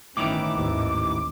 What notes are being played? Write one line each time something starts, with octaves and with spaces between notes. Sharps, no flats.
G1 A2 D#3 E3 C#4 D6
A1 D#2 G#2